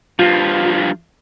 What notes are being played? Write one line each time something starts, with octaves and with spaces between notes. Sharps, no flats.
G2 F3 F4